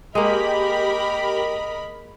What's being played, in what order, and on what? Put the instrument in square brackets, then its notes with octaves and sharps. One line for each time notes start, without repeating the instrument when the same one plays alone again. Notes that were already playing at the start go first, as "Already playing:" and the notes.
[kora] G#3 A#3 [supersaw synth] G4 [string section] A#4 B5 [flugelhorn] D#5